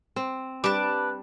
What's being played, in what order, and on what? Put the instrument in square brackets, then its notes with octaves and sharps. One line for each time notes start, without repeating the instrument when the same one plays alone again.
[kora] C4
[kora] G3 D4 [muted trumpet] B4 [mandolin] A5 D6